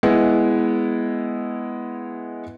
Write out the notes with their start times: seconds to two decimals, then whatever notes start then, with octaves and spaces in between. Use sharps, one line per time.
0.03 G#3 B3 E4